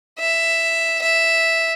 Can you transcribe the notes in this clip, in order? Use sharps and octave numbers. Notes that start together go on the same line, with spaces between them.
E5
E5